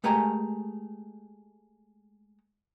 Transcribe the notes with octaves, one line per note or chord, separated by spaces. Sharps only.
G#3 A3 G4 A#4 G#5 A#5